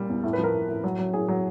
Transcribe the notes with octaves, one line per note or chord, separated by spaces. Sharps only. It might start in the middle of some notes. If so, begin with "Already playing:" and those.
Already playing: A#2 G3
E2
A2
B4
F3
A#4
A2
A2
F#3
F#3
A2 G#4
F#3